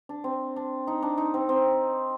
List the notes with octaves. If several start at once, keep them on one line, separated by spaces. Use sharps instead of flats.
D4
C4
D4
D#4
D4
D#4
C4
C4